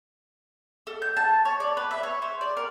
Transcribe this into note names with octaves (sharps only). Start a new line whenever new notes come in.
A4
G6
A5
C#5
D5
B4
E5
C#5
C5
D5
A#4